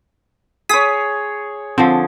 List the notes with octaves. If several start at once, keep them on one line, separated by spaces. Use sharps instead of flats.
G#4 C#5 D#6 B6
D3 F3 C4